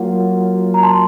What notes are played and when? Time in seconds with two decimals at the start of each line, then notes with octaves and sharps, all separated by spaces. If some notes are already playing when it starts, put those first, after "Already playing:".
Already playing: F#3 A#3 F4 F#5
0.74 A#5
0.83 A5 C6